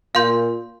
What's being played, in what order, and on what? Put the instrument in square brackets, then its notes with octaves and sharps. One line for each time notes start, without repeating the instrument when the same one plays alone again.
[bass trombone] A#2 [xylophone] F5 C6 G6